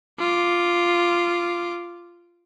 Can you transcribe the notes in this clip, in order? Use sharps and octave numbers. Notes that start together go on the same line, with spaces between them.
F4 D6